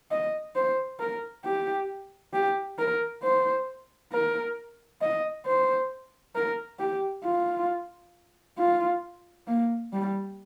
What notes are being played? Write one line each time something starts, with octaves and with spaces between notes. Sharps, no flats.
D#5
C5
A#4
G4
G4
A#4
C5
A#4
D#5
C5
A#4
G4
F4
F4
A#3
G3